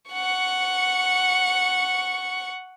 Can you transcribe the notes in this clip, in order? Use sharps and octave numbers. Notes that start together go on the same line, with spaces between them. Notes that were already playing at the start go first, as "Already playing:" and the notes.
F#5 C#6